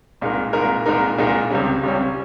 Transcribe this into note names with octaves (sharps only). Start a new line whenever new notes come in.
C2 A#2 G#3 D#4 A#4
C2 A#2 G#3 D#4 A#4
C2 A#2 G#3 D#4 A#4
C2 A#2 G#3 D#4 A#4
C#2 C3 G3 C#4
C#2 C3 G3 C#4